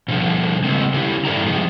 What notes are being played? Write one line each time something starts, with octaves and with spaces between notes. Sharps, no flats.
B2 D3 F3
C#3 G#3 A#3 C4
D3 C#4 E4 G4
G2 E4 A4 D5 G5 A#5
C3 F3 G#3